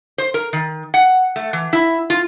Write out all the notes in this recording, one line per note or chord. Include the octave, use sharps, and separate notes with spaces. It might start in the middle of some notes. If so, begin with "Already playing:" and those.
C5
A#4
D#3
F#5
A3
E3
E4
F4